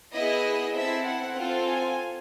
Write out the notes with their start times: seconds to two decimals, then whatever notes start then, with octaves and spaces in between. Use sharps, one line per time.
0.14 B3 E4 G#4 D#5
0.75 C4 E4 A4 E5
1.06 F#5
1.37 C4 F4 A4
1.67 G#5